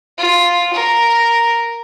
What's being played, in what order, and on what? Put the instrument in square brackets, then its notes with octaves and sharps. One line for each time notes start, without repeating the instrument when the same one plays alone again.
[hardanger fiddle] F4
A#4